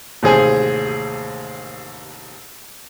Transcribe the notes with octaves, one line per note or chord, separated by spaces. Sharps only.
A1 D#2 C3 G#4 C5 G#5